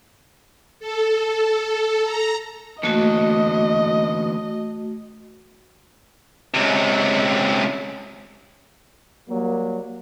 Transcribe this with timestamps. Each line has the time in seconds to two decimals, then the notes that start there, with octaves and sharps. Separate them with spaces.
0.80 A4
2.05 A#5
2.83 D3 E3 A3 A#3 F#4 D#5
6.54 C#2 C3
9.29 F#3 G3 A#3